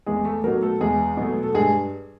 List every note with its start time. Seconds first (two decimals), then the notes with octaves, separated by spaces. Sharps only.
0.06 E2 G#3 G#4
0.25 A3 A4
0.44 B2 F#3 A3 A#3 A#4
0.62 A3 A4
0.81 E2 G#3 G#4
1.17 B2 F#3 A3
1.43 A4
1.54 G2 G#3 G#4